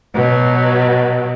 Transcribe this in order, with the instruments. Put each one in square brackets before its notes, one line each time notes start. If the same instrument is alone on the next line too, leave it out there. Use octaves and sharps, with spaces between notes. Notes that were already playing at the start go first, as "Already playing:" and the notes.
[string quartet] B2 F#3